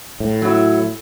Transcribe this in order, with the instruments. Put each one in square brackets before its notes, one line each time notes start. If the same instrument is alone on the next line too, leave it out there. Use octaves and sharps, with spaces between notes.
[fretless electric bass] A2
[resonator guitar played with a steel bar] F#3 E4